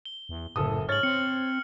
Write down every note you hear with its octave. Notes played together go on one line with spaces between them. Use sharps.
G7
E2
F#1 A2 A4 D#6
G#2 C#5 F6 A6 F#7
C4 C#7